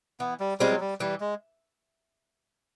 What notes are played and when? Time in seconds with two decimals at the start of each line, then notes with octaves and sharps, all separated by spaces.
0.20 E3 B3
0.40 G3
0.60 G3 G#3 C4 F4
0.71 F#3
0.80 G3
1.00 E3 G3
1.20 G#3